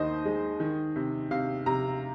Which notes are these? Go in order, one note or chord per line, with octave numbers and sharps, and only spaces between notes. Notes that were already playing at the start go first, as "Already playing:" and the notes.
Already playing: D#2 D#3 C5 D#5
G#3
D#3
C3
C3 F5
C3 A#5